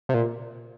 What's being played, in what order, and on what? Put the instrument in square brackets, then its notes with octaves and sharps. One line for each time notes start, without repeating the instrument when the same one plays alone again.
[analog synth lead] C3
A#2